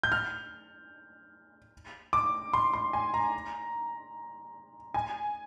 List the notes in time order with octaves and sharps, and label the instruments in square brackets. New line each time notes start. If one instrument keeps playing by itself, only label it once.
[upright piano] G6
F6
D6
C6
C6
G#5
A#5
G#5